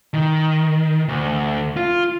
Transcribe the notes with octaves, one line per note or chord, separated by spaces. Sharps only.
D#3
D2
F4